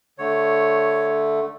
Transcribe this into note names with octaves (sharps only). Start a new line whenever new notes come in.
D3 A3 C#5